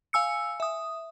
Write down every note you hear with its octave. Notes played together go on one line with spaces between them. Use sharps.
F5 G#5 E6 C#7
E5 D#6